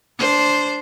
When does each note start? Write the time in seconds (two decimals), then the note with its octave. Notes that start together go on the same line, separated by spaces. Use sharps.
0.19 D4 C5